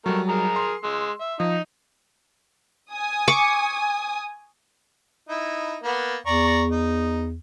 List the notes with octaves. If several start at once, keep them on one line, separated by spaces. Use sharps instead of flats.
F#3 G3 A3 A#4
G#4 A#4 A#5
C6
G#3 E6
E5
F3 D#4 D#5
G#5 D#6
C#6 D6
D#4 E4
A#3 B3
E2 D5 A#5 C#6
D#4